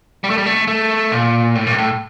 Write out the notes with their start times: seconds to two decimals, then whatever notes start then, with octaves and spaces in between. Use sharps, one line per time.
0.24 G3
0.30 A3
0.38 G3
0.46 A3
0.67 A3
1.12 A#2
1.55 A2
1.67 A#2
1.72 G2
1.78 A2